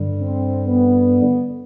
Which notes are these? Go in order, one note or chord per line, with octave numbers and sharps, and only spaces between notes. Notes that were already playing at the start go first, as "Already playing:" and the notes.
Already playing: G2 D3 G3
C4
B3